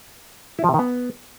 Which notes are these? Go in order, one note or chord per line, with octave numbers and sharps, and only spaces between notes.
E4
F3
C3
D#3
B3